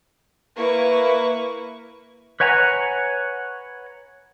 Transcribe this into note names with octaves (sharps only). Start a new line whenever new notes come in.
A#3 E4 B4 C#6
B4 C#5 F#5 G#5 A#5